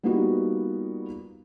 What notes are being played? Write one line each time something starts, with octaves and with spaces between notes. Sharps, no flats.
G3 A#3 B3 D#4 F4 F#4